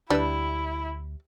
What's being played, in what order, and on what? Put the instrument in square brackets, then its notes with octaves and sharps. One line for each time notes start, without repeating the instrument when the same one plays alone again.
[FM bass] D2 [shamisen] G3 [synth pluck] D4 B4 E6 [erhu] E4